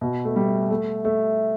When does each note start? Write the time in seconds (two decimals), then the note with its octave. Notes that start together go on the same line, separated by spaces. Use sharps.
0.01 B2
0.25 A3
0.36 G3
0.70 A3
1.05 A3